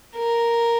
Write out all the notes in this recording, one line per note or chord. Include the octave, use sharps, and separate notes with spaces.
A#4